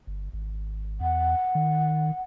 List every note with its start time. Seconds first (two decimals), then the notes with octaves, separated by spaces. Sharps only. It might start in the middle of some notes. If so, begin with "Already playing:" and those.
0.07 G1
0.33 G#1
1.01 E2 F#5
1.55 D#3